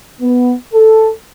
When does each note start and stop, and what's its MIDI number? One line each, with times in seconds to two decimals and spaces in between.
0.21 0.53 59
0.74 1.09 69